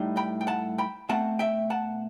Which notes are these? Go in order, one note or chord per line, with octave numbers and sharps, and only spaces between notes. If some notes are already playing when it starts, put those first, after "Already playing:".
Already playing: A2 G3 D#4
G5 B5
G5
F#5 A5
G5 B5
B2 A3 C4 F#5 A5
E5 G5
F#5 A5